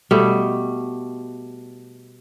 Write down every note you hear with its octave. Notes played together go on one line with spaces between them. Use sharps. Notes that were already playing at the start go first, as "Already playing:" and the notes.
B2 G3 A3